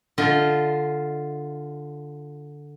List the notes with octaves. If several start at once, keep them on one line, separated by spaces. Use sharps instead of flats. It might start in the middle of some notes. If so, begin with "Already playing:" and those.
D3 F4 D#5